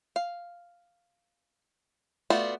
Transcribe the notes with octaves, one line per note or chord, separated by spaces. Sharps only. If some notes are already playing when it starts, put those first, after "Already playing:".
F5
A3 B3 F4 F#4 D5